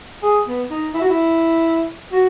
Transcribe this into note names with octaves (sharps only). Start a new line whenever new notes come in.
G#4
B3
D#4
E4
F#4
E4
F#4